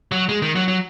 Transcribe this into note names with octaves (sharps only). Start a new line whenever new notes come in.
F#3
G#3
D#3
F#3
F#3